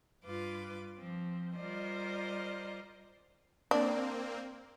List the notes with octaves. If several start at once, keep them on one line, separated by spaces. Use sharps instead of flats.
G2 F4 B4 D6
F3 C4
G3 F4 A#4 C5 D5 D#5
A#3 C4 D4 D5